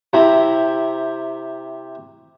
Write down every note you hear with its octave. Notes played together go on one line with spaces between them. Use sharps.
C3 C4 E4 A#5